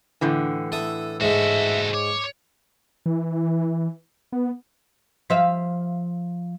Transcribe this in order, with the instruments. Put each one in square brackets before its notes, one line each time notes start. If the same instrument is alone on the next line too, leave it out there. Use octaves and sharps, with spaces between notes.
[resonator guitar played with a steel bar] A2 D3 E3
[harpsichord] A4 E5 D#6
[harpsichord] G#2 G#3 [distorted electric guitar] F#4 A4 [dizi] E5
[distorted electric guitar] C#5 [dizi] D6
[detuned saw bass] E3
B3
[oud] F3 E5 F5